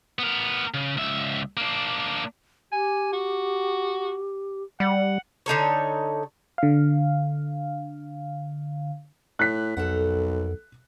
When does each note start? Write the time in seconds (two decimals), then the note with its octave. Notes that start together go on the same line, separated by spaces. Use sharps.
0.19 B3 A#4
0.74 C#3
0.97 C#2 E5
1.57 A#3 D4
2.72 G4 G#5
3.13 F#4
4.80 G3 F#5
5.46 D3 D#4 A4 C#5
6.58 D3 F5
9.39 A2 F#6 B6
9.77 B1 F2 A4 A#4 F#5